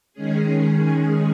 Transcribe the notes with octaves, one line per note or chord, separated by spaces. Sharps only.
D#3 G#3 C#4 G#4